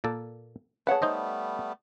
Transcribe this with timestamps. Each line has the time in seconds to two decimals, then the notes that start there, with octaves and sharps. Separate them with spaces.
0.04 A#2 A#3 A4
0.87 A3 G#4 B4 C#5 F#5 A5
1.02 G3 A3 B3 D#4 C5 D#5